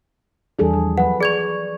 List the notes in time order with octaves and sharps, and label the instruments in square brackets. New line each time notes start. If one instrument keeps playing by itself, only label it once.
[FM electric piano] E2 G3 D4 [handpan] E3 G#4 A4
[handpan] F3
[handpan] F#3 B4 [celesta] F#5
[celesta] G#4 G#6 F7 [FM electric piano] D5 C#6